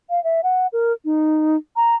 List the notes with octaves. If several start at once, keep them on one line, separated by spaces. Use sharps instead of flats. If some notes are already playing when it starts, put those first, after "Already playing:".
F5
E5
F#5
A#4
D#4
A#5